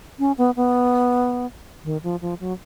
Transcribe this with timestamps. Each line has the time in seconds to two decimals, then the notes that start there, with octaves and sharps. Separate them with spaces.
0.19 C#4
0.38 B3
0.56 B3
1.84 D#3
2.03 F3
2.21 F3
2.40 F#3